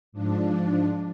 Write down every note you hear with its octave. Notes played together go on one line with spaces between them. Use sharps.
G#2 F3 D4